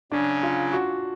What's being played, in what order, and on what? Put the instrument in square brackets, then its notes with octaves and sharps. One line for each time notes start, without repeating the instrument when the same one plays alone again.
[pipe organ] C#3 F#3 C#4 [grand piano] D4
[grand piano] F4
F#4